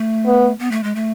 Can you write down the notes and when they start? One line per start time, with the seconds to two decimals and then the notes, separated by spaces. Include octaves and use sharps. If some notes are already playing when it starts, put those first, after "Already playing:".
Already playing: A3
0.26 B3
0.59 B3
0.72 A3
0.83 G#3
0.95 A3